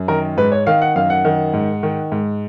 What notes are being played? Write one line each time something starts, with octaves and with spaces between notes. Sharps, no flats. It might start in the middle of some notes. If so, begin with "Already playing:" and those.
Already playing: F#2
D#3 A#4
G#2 B4
C#5
D#3 F5
F#5
F#2 F5
F#5
D#3
G#2
D#3
G#2